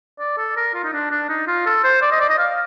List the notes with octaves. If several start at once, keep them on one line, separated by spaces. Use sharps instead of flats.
D5
A4
A#4
F4
D#4
D4
D4
D#4
F4
A4
C5
D5
D#5
D5
D#5
F5